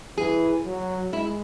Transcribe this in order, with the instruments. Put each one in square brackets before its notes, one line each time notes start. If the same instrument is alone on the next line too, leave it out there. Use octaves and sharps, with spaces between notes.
[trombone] E3 [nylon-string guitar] G#4
[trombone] F#3
[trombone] G#3 [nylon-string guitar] E4